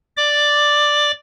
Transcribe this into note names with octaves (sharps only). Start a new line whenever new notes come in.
D5 D6